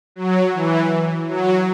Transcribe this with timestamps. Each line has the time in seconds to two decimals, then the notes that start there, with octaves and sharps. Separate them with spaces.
0.16 F#3
0.54 E3
1.29 F#3